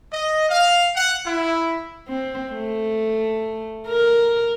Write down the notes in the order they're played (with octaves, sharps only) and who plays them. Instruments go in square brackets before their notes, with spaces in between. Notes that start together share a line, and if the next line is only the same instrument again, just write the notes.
[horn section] D#5
F5
F#5
E4
[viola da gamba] C4
A3
A#4